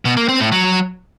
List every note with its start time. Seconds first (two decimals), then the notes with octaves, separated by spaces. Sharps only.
0.05 B2
0.17 A#3
0.28 C4
0.40 A2
0.52 F#3